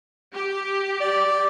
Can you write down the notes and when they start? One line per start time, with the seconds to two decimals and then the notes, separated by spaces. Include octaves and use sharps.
0.33 G4
1.01 D5